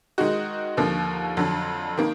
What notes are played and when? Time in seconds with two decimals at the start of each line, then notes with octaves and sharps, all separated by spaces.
0.18 D#3 G#3 D#4 F#4
0.77 D#2 D3 F3 A#3
1.37 F2 D3 F#3
1.98 D#3 A#3